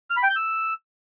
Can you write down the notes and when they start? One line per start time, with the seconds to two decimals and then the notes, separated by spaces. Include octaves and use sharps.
0.10 F6
0.17 B5
0.23 G5
0.30 G6
0.36 E6